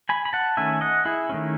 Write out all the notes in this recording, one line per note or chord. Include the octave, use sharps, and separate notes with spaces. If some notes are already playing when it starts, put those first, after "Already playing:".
G#5 B5
B5
F#5 A5
D#3 A3 C#4 E5 G#5
D#5 F#5
E4 G#4
D#3 A3 C#4